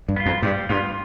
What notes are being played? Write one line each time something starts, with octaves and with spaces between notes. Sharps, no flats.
G2
B3 F4
F2
G2 G3
G2 B3 F4